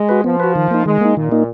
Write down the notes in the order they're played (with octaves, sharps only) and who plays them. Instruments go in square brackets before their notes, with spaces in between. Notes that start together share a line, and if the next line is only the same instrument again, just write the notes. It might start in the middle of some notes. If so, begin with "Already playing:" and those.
Already playing: [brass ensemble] G#3
[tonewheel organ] F#4 B4
[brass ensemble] F3 [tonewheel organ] B3
[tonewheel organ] F#4 B4
D#3
A#3 D#4
[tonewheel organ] D#3 [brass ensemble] G#3
[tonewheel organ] A#3 D#4
[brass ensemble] A#2 [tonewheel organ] D#3
[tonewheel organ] A#3 D#4